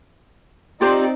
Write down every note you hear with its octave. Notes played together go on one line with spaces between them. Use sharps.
C4 D#4 F4 G4 C5 D5